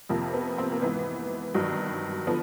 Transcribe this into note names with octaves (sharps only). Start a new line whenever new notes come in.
F2 C3 F3 A#3
B3
C4
A#3
G#2 E3 B3
G2 D#3 F#3
D3 F3 B3